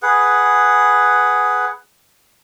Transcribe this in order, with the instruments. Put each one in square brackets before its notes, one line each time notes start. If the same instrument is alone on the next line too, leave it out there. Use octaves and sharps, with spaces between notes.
[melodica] G#4 B4 F#5